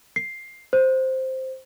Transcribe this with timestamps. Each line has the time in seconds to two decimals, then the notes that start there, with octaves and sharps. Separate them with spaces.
0.16 C7
0.73 C5